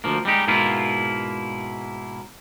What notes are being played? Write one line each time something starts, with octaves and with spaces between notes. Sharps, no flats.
D2 F3 A#3
G3 G#3 D#4 G4
G#2 B2 A#3 E4 F4